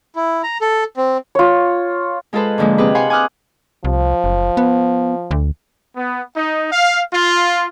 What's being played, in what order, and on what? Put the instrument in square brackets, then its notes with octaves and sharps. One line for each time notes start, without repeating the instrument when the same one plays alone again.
[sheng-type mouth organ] E4
A#5
A4
C4
[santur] F4 C#5
[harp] G#3 F4 G#4 A4 B4 C5
G#2 D3 F3 G#3 A#3
C3 C4 G4 G#4 B4
C5 F5 F#5 G#5 B5 C6
G#5 D6 D#6 F6 F#6
[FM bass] C2 [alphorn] F3
[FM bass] F#1
B3
D2
[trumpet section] B3
D#4
F5
F4